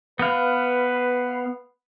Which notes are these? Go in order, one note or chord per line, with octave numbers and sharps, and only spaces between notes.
B3 B4 F5